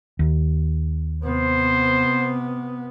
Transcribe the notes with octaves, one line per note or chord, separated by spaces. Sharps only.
D#2
C3 B3 C5